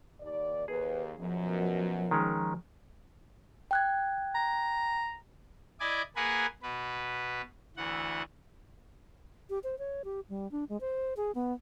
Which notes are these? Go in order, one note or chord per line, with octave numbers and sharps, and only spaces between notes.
D#2 D5
D#2 G#4 B4
F#2 B2 F3
D#3 G#3 C#4
G5 F#6 G#6
A#5
E4 D5 D#5 G#5 D6
A#3 G#4 A#4 B4 F#5 G#5
B2 B4
D2 E3 F#5
G4
C5
C#5
G4
G3
D4
G#3
C5
G#4
B3